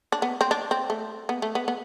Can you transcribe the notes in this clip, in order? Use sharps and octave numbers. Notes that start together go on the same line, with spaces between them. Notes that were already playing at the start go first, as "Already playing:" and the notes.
D4
B3
C4
D4
C4
A3
B3
A3
B3
B3